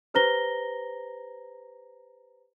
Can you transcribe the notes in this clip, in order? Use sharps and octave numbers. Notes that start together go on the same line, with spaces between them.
G4 B4 C5 A#5 A#6 G7